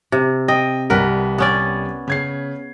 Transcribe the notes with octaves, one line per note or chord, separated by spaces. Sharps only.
C3
D#5 G5
C2 G3 A#4 B4 F#5
B3 C#4 D5
C#3 G#6 C7